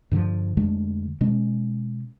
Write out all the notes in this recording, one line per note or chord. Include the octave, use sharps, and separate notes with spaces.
G2 D3 E3 F3
F2 D3 G#3 A3
B2 G#3 C#4